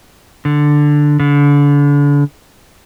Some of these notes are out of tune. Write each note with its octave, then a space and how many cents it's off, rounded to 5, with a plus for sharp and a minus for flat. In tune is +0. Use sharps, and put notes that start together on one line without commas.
D3 +5
D3 -35